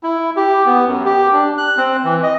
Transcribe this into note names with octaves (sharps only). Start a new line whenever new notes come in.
E4
G4
B3
F#2
G4
D4
F#6
C4
E3
D#5